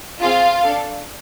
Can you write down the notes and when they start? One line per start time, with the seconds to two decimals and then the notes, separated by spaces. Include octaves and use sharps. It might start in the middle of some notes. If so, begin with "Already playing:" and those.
0.21 C4 F4 G#4 F5
0.64 D4 A4